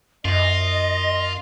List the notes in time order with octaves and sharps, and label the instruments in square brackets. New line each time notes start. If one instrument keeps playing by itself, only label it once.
[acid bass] F#2 [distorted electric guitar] F4 [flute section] D#5